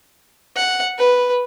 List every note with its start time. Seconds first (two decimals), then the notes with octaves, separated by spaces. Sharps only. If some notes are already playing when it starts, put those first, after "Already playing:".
0.56 F#5
0.98 B4